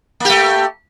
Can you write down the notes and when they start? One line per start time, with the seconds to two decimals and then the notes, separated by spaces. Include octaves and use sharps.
0.20 A#3
0.25 G4
0.30 A3